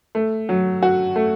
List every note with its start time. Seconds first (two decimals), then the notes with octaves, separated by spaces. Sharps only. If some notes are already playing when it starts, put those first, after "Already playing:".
0.15 A3
0.49 F#3
0.83 F#4
1.16 A3